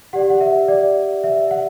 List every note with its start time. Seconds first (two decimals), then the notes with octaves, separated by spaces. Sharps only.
0.13 G4 D5 F#5
0.30 F#5
0.41 E5
0.68 D5
1.24 E5
1.51 F#5